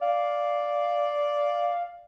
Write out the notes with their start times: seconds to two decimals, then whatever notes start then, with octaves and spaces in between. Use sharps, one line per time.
0.01 D5 F5